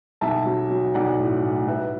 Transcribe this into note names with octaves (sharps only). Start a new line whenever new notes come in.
B1 E5 A5
F#3
F#3
B1 D5 F#5
A2
A2
F#3 B4 E5